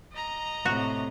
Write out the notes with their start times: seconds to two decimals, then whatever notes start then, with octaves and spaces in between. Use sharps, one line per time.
0.13 D#5 A#5
0.65 A2 C3 F#4